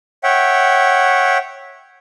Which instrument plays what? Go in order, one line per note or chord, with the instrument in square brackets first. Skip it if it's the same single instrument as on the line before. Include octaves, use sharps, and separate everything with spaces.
[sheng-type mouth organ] C#5 E5 F#5 G5